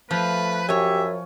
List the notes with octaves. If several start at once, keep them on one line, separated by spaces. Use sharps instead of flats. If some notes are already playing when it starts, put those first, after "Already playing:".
F3 A3 B4
F#2 G4 C#5 E5 G#5